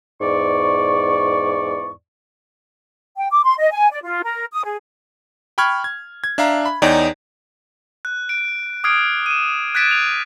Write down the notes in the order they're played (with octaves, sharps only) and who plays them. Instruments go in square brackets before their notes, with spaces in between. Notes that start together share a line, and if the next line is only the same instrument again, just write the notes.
[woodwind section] E2 G#2 D5 C#6
[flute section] G5
D6
C6
D#5
G#5
D5
F4
A#4
D#6
G#4
[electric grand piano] G5 B5 C#6 F6 G#6
G#6
G#6
D4 E5 F5 A#5
B5
E2 D#4 C#5 D5 G5
[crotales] F#6
D7
D6 D#6 F6 G#6 C7 D7
D#7 E7
F#6 G#6 A6 B6 D7 E7
F7